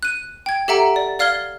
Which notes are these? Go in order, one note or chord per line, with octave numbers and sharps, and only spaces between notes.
F#6 D#7
G5 G#6
G4 A4 E5 F#5 A#5 D7
D5
D5 F5 F6 G#6 G7